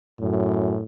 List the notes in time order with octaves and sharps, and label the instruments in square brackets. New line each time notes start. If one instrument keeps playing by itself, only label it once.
[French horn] F#2 [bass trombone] A2